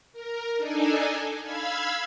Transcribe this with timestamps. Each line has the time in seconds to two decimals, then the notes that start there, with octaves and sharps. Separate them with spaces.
0.13 A#4
0.57 D4 D#4 A4 G#5
1.42 F5 B5 E6 G#6